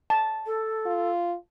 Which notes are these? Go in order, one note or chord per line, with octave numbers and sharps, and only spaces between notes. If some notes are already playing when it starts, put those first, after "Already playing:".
A5
A4
F4